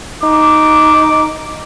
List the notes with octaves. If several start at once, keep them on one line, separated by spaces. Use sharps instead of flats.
D#4 D6